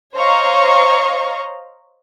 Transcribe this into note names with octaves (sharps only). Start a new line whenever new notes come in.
C5 C#5 D#5 F5 A#5 C#6